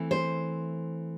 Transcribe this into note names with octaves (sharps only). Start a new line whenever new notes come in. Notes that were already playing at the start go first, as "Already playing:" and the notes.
Already playing: E3 A3 C4
C5